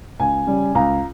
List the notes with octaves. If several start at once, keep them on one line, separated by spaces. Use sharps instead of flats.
C#2 G#5
C#3 G3
C#2 A#5